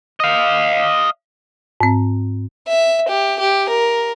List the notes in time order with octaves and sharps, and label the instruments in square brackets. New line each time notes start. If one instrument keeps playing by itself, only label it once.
[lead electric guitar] D#5 F5
[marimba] G#2 C4
[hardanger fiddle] E5
G4
G4
A#4